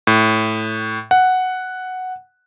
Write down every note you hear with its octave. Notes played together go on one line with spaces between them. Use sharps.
A2
F#5